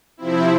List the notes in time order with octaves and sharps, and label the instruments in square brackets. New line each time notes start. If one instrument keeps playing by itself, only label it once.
[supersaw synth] C3 F3 C4 E4